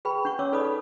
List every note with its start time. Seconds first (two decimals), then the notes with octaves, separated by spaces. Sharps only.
0.05 G#4 B4 G5 B5
0.25 D4 F#5 C#6
0.39 C#4 C#5 D6 E6
0.52 D#4 A4 B4 D5 B5 D#6
0.64 A4